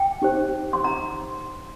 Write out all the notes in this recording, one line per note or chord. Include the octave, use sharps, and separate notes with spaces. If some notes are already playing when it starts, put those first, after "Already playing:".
Already playing: G5
D#4 G4 C5
C6
A#5